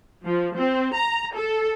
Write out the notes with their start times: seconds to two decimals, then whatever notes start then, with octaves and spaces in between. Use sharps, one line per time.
0.24 F3
0.56 C4
0.94 A#5
1.34 A4